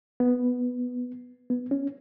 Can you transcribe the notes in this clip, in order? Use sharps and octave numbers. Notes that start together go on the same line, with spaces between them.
B3
B3
C#4